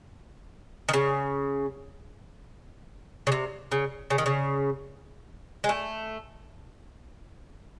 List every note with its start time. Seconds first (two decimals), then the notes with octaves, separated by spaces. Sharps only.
0.89 D#3
0.94 C#3
3.27 C#3
3.32 C3
3.72 C#3
4.10 C#3
4.18 D#3
4.26 C#3
5.64 G#3
5.69 A3